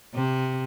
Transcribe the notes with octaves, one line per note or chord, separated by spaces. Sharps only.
C3